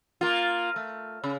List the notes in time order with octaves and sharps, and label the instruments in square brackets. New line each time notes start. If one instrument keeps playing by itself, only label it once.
[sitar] A#3 F4
A3
C#3